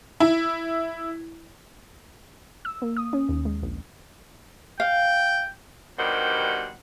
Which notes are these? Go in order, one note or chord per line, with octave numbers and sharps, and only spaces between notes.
E4
E6
A#3
D#6
C#4
D#2
G#3
A#1
F5 G5
G2 B2 D#3 G3 C5 F#5